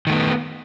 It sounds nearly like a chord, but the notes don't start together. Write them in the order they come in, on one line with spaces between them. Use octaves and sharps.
D#3 A3 B3